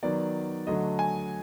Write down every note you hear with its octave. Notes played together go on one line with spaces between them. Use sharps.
D#3 F#3 B3 D5
D3 F#3 A3 D#5
G#5